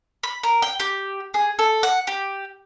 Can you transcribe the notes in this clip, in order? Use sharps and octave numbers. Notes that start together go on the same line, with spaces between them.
B5
A#4
G5
G4
G#4
A4
F#5
G4